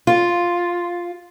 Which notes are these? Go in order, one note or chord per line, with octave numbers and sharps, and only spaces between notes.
F4